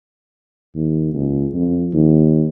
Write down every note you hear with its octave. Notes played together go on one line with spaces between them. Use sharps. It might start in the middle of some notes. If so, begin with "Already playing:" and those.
D#2
C#2
F2
D#2